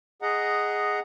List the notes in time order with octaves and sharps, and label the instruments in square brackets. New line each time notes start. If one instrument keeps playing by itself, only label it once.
[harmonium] G#4 D#5 F#5 A#5